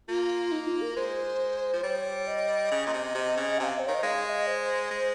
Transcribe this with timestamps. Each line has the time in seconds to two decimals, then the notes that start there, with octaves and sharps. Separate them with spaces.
0.08 A#3 F4
0.52 D#4
0.67 F4
0.81 A#4
0.96 G#3 C5
1.73 F3
1.83 G3 C#5
2.16 C#5
2.27 D#5
2.71 C#3
2.87 A#2
2.94 C3
3.15 C3
3.37 C#3
3.49 D#5
3.59 C3 F5 G#5
3.79 C5
3.87 D#3 C#5
3.95 D#5
4.03 G#3 F5
4.25 F5
4.29 D#5
4.47 C5
4.91 G#3